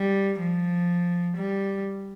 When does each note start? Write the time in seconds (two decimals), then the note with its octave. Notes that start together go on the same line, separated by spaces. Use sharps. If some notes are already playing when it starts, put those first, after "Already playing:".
Already playing: G3
0.40 F3
1.37 G3